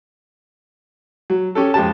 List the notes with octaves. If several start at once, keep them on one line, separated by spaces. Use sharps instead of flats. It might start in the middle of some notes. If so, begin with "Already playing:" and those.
F#3
C#4 G4 A4
F2 G#3 G4 A5